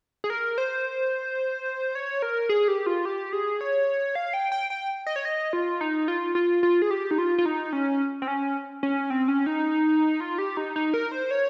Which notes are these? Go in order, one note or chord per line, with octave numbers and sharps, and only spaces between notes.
G#4
A#4
C5
C#5
A#4
G#4
G4
F4
G4
G#4
C#5
F5
G5
G5
G5
D#5
C#5
D#5
F4
D#4
F4
F4
F4
G#4
G4
D#4
F4
F4
D#4
C#4
C4
C#4
C#4
C4
C#4
D#4
F4
G4
D#4
D#4
A#4
C5
C#5